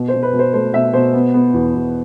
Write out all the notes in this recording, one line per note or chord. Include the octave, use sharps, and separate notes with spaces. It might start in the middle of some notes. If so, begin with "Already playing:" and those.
Already playing: B2
C5
B2
B4
B2
C5
A3 C5
B2 E5
B2 C5
B3
B3
E2
E2